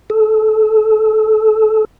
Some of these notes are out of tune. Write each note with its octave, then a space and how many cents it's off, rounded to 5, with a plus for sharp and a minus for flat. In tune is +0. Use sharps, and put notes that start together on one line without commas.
A4 -20